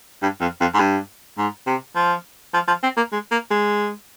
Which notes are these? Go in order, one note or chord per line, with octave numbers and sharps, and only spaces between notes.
G2
F2
F2
G#2
G2
G#2
C3
F3
F3
F3
C4
A#3
G#3
A#3
G#3